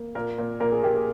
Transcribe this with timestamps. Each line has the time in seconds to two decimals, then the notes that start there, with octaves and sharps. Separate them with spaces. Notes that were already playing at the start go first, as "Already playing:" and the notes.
Already playing: A#3
0.15 A#2 A#4
0.38 A#2
0.60 A#2 A#4
0.72 G#4
0.83 A#3 G4
0.94 G#4